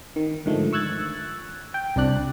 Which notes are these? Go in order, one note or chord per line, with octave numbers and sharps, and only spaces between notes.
D#3
G#2 D3 D#3 F3 A3
C#6 E6 F#6 G#6 A6
G5
C2 C3 D4 D5 F#6